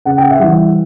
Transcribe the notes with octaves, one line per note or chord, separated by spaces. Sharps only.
C#3 F#5
G5
E5 F#5
E3 G3